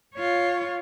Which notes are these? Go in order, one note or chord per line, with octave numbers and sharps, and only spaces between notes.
F4 C#5